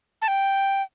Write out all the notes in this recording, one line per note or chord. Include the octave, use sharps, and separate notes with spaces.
A5
G5